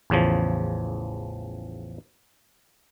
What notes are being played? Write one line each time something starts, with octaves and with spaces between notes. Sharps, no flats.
A1 E2 C#3 F3